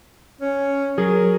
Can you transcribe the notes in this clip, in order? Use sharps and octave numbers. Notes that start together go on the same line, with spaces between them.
C#4
F#3 G#4 A#4